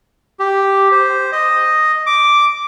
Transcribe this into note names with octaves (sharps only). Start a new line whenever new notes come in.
G4
C5
D#5
D6